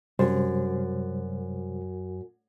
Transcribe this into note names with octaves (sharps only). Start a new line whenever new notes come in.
F#2 C3 G3 C5